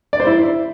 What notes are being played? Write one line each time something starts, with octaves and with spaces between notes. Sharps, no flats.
D5
C5
E4